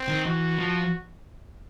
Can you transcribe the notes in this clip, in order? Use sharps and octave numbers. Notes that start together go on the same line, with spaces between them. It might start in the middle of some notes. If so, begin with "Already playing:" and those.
Already playing: C4
D#3
E3 F#4
F3